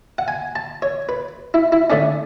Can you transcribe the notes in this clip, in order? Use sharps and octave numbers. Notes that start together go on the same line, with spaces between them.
F#5
G#5
A5
C#5
B4
E4
E4
D3 A3 C#4 D4